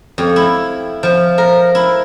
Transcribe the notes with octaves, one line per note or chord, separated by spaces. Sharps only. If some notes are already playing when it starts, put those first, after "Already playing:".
F2
E4
F3
A#4
E4